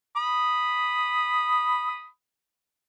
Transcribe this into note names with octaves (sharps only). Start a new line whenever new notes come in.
B5 D#6